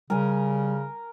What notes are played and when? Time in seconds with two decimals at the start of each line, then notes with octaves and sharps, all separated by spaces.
0.10 C#3 G3 A#4 G#5